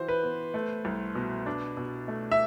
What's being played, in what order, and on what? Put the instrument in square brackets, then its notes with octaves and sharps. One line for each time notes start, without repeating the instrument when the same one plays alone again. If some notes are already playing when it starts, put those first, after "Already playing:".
Already playing: [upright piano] E3 F#4 [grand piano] C5
[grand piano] B4
[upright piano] B3
A3
C2
B2
D4
B2
A3
[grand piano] E5